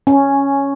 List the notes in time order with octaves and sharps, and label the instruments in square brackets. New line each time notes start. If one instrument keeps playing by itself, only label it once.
[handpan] C#4